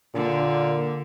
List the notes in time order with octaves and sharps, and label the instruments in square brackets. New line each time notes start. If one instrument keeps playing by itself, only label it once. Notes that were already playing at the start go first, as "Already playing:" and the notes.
[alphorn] A#2 [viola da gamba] D3